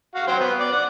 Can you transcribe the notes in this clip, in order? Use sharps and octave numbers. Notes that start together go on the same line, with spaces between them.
F#4 F5
F#3 C5 G5
B3
D5
F#5